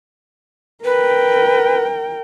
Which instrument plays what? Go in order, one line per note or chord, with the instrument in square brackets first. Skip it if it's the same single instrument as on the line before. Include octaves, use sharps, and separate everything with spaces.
[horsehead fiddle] A#4 G5 [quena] B4